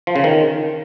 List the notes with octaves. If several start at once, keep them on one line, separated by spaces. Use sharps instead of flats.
F3
C#3
D#3